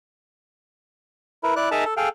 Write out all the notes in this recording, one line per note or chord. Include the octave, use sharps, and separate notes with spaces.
E4 A#4 B4
E4 D5 F#6
D#4 G#4 A#4 E5 A5 A#5
A4
G#4 A4 F5 G5